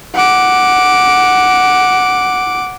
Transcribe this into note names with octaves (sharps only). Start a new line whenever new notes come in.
F#5 D6